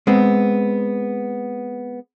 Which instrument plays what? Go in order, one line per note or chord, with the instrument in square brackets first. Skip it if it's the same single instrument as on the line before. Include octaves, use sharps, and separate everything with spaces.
[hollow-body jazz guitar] G#3 B3 C4